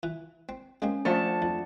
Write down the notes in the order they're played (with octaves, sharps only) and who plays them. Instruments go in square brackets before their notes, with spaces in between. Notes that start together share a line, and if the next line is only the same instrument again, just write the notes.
[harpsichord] E3
C4
[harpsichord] G#3 A#3 C4 [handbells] C#4
[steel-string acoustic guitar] F3 A3 A5 [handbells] D4 D5 F#5
[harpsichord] F2